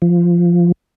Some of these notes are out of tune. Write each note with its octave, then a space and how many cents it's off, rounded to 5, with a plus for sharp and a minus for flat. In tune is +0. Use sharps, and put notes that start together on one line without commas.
F3 -10